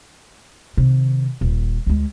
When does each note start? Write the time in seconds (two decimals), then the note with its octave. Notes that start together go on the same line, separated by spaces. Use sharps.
0.77 C3 D#3
1.41 D#1
1.86 D2 G#3